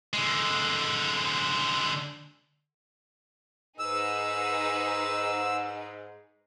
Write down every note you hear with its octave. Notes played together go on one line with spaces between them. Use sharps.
D3 G#3
G#2 D#4 G#4 B4 E6